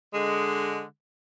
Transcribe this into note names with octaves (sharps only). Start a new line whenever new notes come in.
D3 G#3